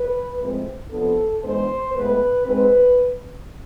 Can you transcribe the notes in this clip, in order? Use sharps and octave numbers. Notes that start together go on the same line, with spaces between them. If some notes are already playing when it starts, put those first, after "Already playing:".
Already playing: B4
A2 F3 G#3 C4
C3 F3 B3 D4 A4
G#2 E3 G#3 B3 D4 C5
A2 G#3 B3 B4
G#2 G#3 C4 B4